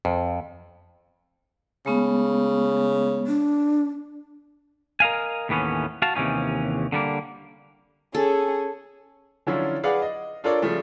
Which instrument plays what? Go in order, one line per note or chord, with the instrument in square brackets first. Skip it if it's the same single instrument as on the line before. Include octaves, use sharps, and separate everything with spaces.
[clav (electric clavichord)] F2
[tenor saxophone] C#3 [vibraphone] G#3 A3 B3
[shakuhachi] D4
[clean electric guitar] A#4 D#5 F5 G#5
D#2 A2 E3 B3 C#4
F#4 F5 A5
D#2 C3 E3 C#4 D#4
D3 G3 A#3
[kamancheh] C#4 G#4 [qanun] A4
[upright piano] D3 F3 F#3 C#4 E4 F4
G#4 B4 D5 F5 F#5
D#5
D4 F4 A4 A#4 C#5 D5
C#3 F3 G3 A3